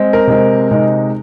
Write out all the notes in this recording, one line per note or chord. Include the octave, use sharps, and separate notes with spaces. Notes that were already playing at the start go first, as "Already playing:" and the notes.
Already playing: G#3 C4
A#4
C3 G#3 C4
C3 G#3 D#4